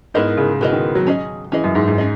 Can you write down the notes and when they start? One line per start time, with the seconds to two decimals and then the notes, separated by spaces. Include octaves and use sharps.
0.14 G#2 B3 E4 A#4 D#5
0.37 C#3
0.61 B2 B3 E4 A#4 D#5
0.72 D#3
0.95 F#3
1.07 C#4 G#4 D#5
1.52 E3 C#4 G#4 D#5
1.64 F#2
1.75 G#2
1.88 G#2
1.98 C#4 G#4 D#5